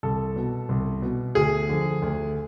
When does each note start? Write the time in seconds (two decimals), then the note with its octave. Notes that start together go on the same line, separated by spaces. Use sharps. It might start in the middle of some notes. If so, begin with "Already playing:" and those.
0.03 C2 A4
0.36 B2
0.69 C2
1.02 B2
1.35 D2 G#4
1.69 D3 F3
2.02 D2